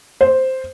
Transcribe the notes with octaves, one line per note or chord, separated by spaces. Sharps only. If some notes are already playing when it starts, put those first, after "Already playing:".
C5